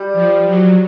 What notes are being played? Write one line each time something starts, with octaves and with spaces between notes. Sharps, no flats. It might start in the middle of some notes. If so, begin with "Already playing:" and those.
Already playing: G3
F3
F#3